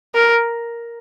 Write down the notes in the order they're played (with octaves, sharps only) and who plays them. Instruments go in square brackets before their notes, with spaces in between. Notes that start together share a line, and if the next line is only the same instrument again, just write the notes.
[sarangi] A#4